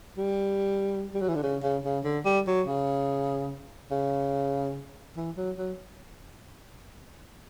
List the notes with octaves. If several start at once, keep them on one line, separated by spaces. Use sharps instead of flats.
G3
G3
F#3
E3
D3
C#3
C#3
C#3
D3
G3
F#3
C#3
C#3
E3
F#3
F#3